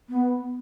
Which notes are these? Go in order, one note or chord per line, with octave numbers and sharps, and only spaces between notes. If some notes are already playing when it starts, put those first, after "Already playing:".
B3